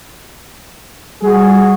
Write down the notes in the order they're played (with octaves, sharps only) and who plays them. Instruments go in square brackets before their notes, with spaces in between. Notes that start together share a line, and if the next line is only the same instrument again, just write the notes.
[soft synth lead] G3 [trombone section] F#4 G#4